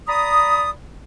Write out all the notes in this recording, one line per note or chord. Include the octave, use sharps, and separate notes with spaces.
D5 A#5 B5 D#6